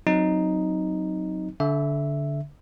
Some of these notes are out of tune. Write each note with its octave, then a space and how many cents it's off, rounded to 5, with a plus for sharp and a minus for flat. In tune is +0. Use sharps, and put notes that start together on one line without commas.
F#3 +0 C4 +0 D#4 +0
D3 -20 E5 +0